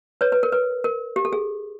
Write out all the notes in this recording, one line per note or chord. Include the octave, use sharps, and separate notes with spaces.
B4 C#5
B4
A#4
B4
A#4
G4
A4
G#4